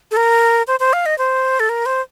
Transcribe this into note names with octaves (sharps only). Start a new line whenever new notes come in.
A4
A#4
C5
C5
F5
D#5
C5
A4
A#4
C5